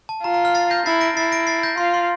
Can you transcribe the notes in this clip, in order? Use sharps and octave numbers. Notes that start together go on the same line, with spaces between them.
A5
F4 A#5
A#5
F6
A6 C7
G6 A#6
E4 A6 C7
A#6 D7
E4 A6 C7
A#6 D7
A6 C7
G6 A#6
F4 C6
C6